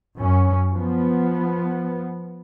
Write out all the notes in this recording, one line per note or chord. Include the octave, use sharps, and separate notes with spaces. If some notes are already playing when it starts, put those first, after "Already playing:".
F#2 C#4
F3 B3